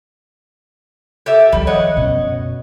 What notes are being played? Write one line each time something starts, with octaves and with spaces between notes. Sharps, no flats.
G4 A4 E5
D#3 F3 G3
C#5 D#5 F#5
F#2 B2